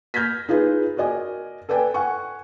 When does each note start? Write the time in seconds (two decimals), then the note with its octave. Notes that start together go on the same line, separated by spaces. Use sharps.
0.14 F6 G6 G#6 A#6 B6
0.49 D#4 F4 G#4 B4
0.97 F#4 A#4 D5 D#5 G#5
1.69 A4 B4 D5 G5 G#5
1.94 F#5 G#5 C#6